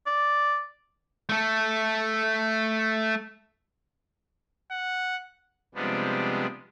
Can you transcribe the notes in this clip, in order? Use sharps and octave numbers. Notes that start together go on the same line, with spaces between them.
D5
A3 A4
F#5
C3 F3 G3 G#3 B3 D4